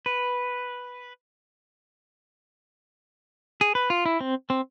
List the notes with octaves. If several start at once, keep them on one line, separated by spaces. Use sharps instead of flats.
B4
G#4
B4
F4
E4
C4
C4